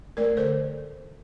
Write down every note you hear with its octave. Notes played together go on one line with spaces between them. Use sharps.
A3 A#4 D5
D3 A4 C5